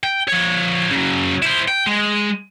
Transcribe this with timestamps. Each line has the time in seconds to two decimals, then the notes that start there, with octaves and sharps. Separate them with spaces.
0.03 G5
0.28 F3 C#5
0.91 C#3 F#3
1.43 E4 C5
1.68 G5
1.87 G#3